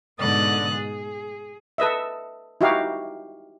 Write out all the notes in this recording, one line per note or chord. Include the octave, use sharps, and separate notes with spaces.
G#2 B2 D3 D#6 F#6 A6
G#4
A4 B4 D#5 E5
D#4 E4 F#4 G4 F5